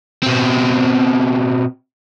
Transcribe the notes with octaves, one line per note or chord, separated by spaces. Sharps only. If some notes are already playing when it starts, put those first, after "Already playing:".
B2 C4